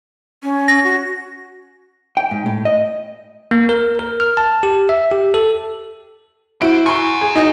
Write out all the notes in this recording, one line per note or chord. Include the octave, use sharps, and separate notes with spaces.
C#4
A#6
F#4
G5
G#2
A2
D#5
A#3
A#4
A#4
F6
A5
G4
E5
G4
A4
E4 F#4 C5 D7
F#5 G#5 C6 C#6
G#4
D#4 F#4 D#5